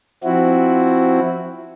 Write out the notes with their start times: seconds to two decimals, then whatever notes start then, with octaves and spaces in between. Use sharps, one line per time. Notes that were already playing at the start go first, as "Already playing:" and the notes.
0.24 F3 C4 E4 F#4